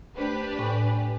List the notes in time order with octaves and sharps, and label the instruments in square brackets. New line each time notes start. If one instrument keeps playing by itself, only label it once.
[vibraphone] A3 C5 [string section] D4 G4 B4
[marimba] A2 [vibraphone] G#5